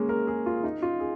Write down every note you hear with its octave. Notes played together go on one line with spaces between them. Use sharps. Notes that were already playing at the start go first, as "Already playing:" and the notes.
Already playing: G#3 A#3 C#4
A#4
G#4
F4
D#4
F4
G#4